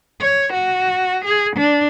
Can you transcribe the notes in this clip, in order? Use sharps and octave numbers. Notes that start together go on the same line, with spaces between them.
C#5
F#4
G#4
D4